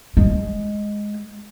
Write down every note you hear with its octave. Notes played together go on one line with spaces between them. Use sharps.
G#3